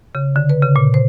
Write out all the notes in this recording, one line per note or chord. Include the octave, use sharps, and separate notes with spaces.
C#3
D3
B4
C#3
A#2
C5